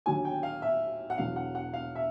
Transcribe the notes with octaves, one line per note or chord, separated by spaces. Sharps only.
D#2 D3 F#3 G#5
G5
F5
E5
F#5
E1 E2 B2 F#3 F5
F#5
F#5
F5
E5